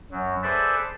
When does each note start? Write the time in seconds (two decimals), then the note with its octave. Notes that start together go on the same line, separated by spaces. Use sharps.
0.12 F#2 F#3
0.43 G#4 A4 B4 C5 D5 E5